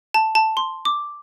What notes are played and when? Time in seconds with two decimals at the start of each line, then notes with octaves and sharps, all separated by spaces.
0.14 A5
0.35 A5
0.57 C6
0.85 D6